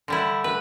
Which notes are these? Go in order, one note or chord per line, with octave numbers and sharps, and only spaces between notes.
D3 G3 E4
B4